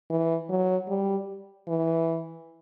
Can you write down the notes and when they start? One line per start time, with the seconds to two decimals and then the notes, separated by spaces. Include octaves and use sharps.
0.10 E3
0.49 F#3
0.88 G3
1.68 E3